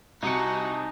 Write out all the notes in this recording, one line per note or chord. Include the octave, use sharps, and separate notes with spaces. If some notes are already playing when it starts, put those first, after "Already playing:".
C2 C3 D#4 F#4 G#5 A5 D#6 C#7